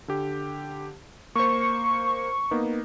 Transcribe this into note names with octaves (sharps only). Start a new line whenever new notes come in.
D3 G4
A#3 C5 C#6
A#3 B3 D#4